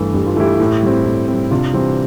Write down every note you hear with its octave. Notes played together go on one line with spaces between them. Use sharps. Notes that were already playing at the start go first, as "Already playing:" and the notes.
Already playing: G2 E3 A3
G2 G4
F4
E3 A3 E4 G4
A2
G3 C4
A2
G3 C4
C3 D4 F4
E3 G3 C4